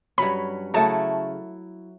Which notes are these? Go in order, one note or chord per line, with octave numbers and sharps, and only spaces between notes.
G2 F#3 C#4 B5
C#3 F#3 A3 E4 A5